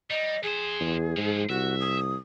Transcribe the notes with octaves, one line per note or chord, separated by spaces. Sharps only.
G3 D#5
F2 G#4 C5
E2
G#2 F3 G#3
C2 F#4 E5
D#6